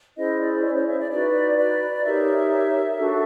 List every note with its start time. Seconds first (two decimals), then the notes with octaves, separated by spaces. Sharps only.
0.17 C#4 E4 G#4 C5 D#5
0.40 D5
0.64 C#5
0.75 C#5
0.88 E5
0.98 D5
1.10 D#4 F#4 B4 D5
1.58 D5
2.03 D#4 G4 A#4 C#5 E5
2.98 D4 F#4 A4